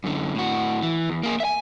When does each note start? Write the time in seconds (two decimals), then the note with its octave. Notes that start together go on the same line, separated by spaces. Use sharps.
0.04 F#2 D3
0.35 A2 F#4
0.83 E3
1.10 E2
1.23 A#3 G#4
1.40 E5 G#5